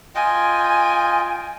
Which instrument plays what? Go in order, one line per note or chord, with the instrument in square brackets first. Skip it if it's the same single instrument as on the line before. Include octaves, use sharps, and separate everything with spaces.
[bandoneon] F4 D#5 G5 [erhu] G#5